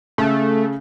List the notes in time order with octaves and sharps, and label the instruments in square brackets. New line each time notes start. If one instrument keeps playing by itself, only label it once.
[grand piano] C#3 [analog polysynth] A3